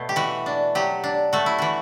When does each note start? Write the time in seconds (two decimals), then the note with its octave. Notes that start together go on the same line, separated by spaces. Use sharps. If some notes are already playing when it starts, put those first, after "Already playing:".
Already playing: B2 A3
0.09 G4
0.16 E3 F#4
0.46 D4
0.75 F#3 G4
1.04 D4
1.33 A3 F#4
1.46 E4
1.59 E3 F#4